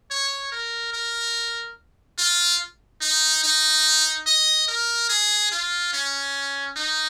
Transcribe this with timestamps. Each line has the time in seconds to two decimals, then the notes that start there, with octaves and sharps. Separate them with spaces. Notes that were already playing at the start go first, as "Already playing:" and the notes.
0.11 C#5
0.52 A#4
0.93 A#4
2.18 F4
3.01 D#4
3.44 D#4
4.27 D#5
4.68 A#4
5.09 G#4
5.51 F4
5.93 C#4
6.77 D#4